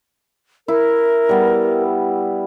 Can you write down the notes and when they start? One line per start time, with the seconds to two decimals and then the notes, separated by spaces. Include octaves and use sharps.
0.68 E4 A#4
1.29 G3 B3